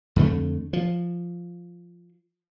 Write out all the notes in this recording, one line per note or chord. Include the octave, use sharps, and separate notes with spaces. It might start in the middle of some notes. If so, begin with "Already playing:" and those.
F2 D3 A3
F3